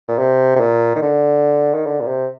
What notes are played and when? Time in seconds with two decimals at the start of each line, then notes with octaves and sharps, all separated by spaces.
0.08 A#2
0.18 C3
0.55 C3
0.60 A#2
0.96 D#3
1.02 D3
1.74 D#3
1.86 D3
2.01 A#2
2.07 C3